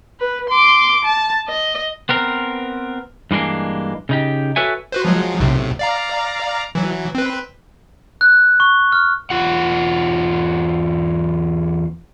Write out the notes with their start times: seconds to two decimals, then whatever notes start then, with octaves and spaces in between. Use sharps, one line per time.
0.20 B4
0.49 C6 D6
1.04 A5
1.48 D#5
2.09 B3 C4 A#4
3.31 G2 E3 G#3 A#3 D4
4.09 C#3 D#4 G4
4.56 F#4 A4 B4 C#5 E5 G#5
4.92 F#4 B4 C5
5.05 F3 F#3 G#3
5.40 B1 A2 C3
5.79 D5 F5 A#5
6.75 E3 F#3
7.15 C4 B4
8.21 F#6
8.60 C#6
8.92 F6
9.30 E2 F4 F#5